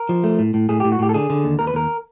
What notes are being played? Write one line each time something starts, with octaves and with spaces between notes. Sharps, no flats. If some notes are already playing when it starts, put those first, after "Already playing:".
Already playing: A#4
F3
A3
A2
A2
A2 G#4
G4
A2
F#4
A2 G4
A4
D3 G#4
D3
D#2
D#2 A#4
B4
D#2 A#4